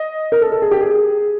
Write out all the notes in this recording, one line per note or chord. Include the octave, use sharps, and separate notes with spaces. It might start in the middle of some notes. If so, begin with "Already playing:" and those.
Already playing: D#5
A#4
A4
A4
G#4
G4
G#4